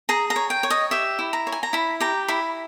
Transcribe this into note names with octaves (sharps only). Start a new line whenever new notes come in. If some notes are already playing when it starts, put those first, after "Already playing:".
G#4 A#5
A#5
C#5
G5
C#5
D#5
G4 E5
E4
A#5
C#5
G#5
A#5
E4 B5
G4 A#5
E4 B5